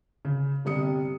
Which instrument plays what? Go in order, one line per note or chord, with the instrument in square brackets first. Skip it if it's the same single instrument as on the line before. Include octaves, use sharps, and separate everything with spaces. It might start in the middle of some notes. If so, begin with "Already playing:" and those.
[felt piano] C#3
G1 C3 G3 D#6 C#7